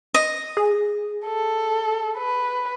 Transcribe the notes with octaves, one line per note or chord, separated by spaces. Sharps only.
D#5
G#4
A4
B4